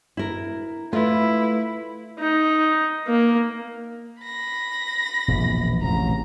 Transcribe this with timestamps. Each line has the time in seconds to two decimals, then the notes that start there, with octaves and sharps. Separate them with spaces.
0.17 E4 A#4
0.93 A3 E4 F4 B4
2.19 D#4
3.07 A#3
4.23 B5 A#6
5.28 E1 A#1 F#2
5.82 A1 E2 C3 A#5